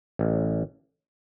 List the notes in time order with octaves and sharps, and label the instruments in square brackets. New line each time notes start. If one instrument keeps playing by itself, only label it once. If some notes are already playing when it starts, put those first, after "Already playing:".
[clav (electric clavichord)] A1